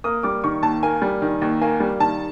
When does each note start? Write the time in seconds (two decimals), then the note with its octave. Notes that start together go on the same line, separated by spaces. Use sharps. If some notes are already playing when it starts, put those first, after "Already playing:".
0.04 A#3 D#6
0.23 G3 D6
0.44 D#3 C#6
0.62 D#2 A5
0.83 A#3 G#5
1.02 G3
1.22 D#3
1.42 D#2
1.62 A#3 G#5
1.80 G3
2.00 D#3 A5